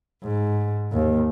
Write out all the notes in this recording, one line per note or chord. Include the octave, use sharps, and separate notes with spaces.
G#2
D#2